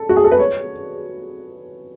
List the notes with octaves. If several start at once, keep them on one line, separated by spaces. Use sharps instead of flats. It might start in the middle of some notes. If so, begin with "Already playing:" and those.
Already playing: A4
F#4
G#4
A4
B4
C#5